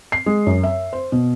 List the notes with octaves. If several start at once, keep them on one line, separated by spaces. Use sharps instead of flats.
C7
G#3
F#2
E5
C5
B2